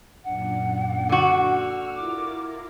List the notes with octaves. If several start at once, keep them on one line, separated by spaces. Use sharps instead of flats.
F#2 A#2 D4 F#5
D3 F#4
E6 F6
E4 F4 A#4 D6